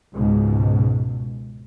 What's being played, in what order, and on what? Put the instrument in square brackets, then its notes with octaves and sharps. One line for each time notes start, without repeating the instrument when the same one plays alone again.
[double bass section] C#2 G#2 B2